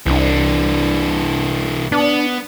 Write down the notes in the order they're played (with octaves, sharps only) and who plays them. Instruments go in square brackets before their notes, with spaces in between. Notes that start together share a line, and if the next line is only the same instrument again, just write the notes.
[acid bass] C2 [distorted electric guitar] E3 D4
[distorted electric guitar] B3 [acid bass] D4